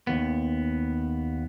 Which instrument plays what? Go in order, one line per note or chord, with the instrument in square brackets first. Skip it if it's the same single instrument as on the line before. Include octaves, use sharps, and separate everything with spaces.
[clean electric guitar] D#2 B3